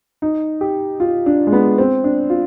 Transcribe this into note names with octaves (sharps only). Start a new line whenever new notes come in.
D#4
G4
F4
D4
G#3
B3
C4
D4
F4